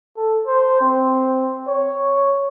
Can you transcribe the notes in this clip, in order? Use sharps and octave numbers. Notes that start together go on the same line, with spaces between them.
A4
C5
C4
C#5